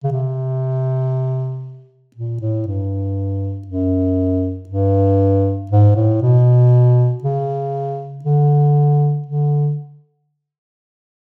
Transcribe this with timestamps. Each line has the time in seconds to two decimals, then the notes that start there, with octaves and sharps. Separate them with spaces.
0.04 C#3
0.12 C3
2.16 A#2
2.41 A2
2.67 G2
3.67 F#2
4.69 G2
5.71 G#2
5.96 A2
6.22 B2
7.24 C#3
8.25 D3
9.26 D3